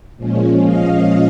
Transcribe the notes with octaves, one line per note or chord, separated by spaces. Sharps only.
A#2 F3 G#3 C#4
D#5 F5